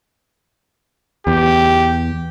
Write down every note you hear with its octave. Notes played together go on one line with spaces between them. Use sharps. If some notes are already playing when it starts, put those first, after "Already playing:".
E2 G4